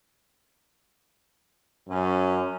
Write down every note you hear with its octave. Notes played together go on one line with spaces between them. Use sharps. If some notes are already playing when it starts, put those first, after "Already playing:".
F#2 C#4